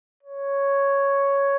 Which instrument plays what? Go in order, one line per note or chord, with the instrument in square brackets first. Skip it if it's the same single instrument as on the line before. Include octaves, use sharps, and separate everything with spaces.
[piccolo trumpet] C#5